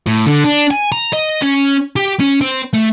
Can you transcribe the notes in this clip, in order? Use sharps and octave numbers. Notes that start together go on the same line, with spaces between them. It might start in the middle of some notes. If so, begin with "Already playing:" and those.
A2
D3
D4
G#5
A#5
D#5
C#4
G4
C#4
C4
A3